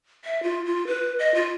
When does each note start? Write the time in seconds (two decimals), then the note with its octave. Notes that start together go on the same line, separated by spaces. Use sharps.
0.25 E5
0.43 F4
0.65 F4
0.87 B4
1.19 D#5
1.35 F4